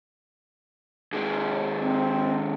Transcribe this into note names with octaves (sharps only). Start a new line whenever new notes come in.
D#2 G#3
C4